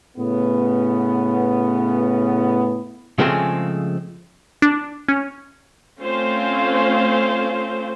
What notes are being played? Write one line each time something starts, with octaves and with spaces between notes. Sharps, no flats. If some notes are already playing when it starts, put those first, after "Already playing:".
A2 C#3 B3
C#3 F3 G#3 A3 C4 G#4
D4
C#4
A3 C4 C#4 F4 C5 F5